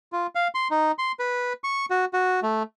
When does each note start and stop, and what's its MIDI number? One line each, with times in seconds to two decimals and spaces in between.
0.12 0.27 65
0.35 0.48 77
0.55 0.68 84
0.71 0.92 63
0.99 1.12 84
1.19 1.53 71
1.64 1.86 85
1.90 2.05 66
2.13 2.40 66
2.43 2.63 57